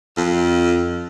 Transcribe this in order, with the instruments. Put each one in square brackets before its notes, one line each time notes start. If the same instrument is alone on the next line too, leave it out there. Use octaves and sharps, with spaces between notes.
[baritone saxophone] F2